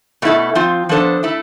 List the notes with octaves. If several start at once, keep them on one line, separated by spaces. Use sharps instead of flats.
B2 A3 E4 A4
F3 C4 F4
F3 B3 D4 A4 C5
A3 E4 A4